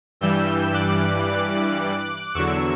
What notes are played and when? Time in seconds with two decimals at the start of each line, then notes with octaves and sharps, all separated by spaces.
0.21 G2 E3 G3 E6 G6
0.74 D6 F#6
1.27 D6 F#6
2.34 E2 D3 F#3 C#6 E6